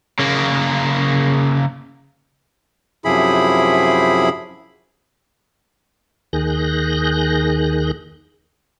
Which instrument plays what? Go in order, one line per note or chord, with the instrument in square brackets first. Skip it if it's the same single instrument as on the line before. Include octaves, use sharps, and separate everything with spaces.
[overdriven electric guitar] C#3 A#3
[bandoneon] F#2 C3 F3 E4 G#4 B5
[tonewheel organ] D#2 D#3 G#4 F#6 G6 A#6